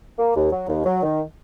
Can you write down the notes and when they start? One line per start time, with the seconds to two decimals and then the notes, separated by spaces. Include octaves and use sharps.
0.19 A#3
0.36 D#2
0.52 F#3
0.69 D#2
0.86 F#3
1.03 D#3